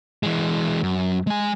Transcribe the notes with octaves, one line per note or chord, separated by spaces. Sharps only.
E3 G#3
F#2
G#3 G#5